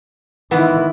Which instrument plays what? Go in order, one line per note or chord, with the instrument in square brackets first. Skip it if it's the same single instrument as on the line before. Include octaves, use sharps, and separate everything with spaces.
[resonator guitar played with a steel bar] G#2 E3 B3 [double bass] D#3 E4